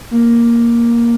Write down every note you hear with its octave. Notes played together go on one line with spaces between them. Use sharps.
A#3